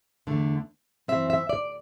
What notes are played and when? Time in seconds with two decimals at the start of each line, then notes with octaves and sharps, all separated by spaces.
0.27 E2 D3 A3
1.08 F#2 E3 A3 C4 E5
1.30 E5
1.49 D5